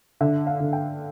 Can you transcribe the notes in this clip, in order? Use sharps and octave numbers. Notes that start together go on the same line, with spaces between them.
D3 E5
F5
D3
G5